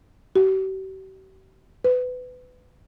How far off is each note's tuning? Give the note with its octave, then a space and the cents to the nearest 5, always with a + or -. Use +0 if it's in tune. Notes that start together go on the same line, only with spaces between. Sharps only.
G4 -45
B4 +25